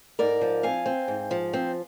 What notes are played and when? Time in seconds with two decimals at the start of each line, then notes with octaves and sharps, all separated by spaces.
0.19 G#2 A#4 D5
0.41 F3
0.63 C4 F5 G#5
0.86 C4
1.08 G#2
1.31 F3
1.54 C4